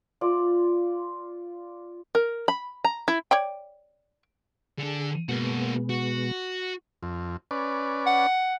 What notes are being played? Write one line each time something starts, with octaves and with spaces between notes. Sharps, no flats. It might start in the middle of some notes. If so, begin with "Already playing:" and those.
F4 D5
A#4
B5
A#5
E4
C#5 D5 G5
D3 D4 G#4
B2 G#3 A#3 B3 F#4
F#4
F2
C#4 B4 D5
F#5